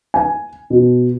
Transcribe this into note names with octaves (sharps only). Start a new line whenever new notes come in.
G#5
B2